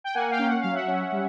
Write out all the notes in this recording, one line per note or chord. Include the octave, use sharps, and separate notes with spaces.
G5
A#3 F#5 G#5
F5 G5
C#4
F#5
F#3 F5
E5 F#5
C#4
G3